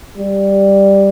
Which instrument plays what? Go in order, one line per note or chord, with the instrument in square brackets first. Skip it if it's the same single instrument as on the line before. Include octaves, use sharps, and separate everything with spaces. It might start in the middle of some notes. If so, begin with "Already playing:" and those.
[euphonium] G3